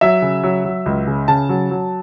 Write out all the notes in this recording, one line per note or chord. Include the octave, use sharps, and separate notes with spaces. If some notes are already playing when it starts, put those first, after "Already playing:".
F#3 E5
C#3
F#3
F#3
C#2
C#3
C#3 A5
F#3
F#3